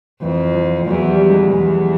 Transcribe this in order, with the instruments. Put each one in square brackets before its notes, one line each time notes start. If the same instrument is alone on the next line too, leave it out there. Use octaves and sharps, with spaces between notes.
[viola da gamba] F2 [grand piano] E3
[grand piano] F3
[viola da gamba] E2 [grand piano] F#3
[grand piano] G3
G#3
[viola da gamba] E2